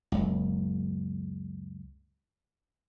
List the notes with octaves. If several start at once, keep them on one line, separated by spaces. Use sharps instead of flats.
F#1 C#2